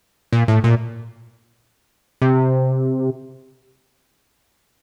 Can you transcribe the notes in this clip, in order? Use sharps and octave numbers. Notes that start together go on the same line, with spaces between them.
A#2
A2
A#2
C3